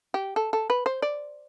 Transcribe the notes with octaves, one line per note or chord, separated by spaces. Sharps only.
G4
A4
A4
B4
C5
D5